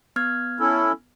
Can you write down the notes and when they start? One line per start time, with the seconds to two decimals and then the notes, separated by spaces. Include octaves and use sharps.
0.16 B3 F6 G#6
0.60 C#4 E4 A4